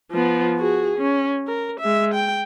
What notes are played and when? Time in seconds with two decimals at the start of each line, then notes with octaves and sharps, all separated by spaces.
0.12 F3 B3
0.57 F#4 G#4
0.98 C#4
1.47 A#4
1.80 G#3 E5
2.14 G5